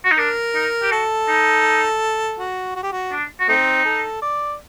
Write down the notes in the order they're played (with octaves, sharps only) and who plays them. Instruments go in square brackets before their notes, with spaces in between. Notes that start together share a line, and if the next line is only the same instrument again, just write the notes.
[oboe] F#4
D#4
[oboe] D4 [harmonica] A#4
[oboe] D#4
G4
[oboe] F#4 [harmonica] A4
[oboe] D#4
[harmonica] F#4
F#4
G4
F#4
[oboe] D4
F#4
[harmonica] A3 C4 [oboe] D#4
[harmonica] A4
D5